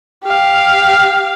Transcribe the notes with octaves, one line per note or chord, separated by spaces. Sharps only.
G4 F5